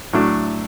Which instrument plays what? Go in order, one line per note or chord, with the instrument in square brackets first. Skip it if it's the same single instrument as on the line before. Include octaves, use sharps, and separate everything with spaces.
[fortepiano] A2 F#3 A3 D4